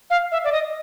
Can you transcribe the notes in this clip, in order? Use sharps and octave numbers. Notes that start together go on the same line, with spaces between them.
F5
E5
D5
D#5